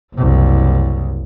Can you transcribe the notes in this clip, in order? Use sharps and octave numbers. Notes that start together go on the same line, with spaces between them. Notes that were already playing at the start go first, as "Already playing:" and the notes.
F#1 C2